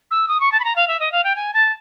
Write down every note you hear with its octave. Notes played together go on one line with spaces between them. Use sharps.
E6
D#6
C#6
A5
B5
A#5
F5
E5
D#5
F5
G5
G#5
A5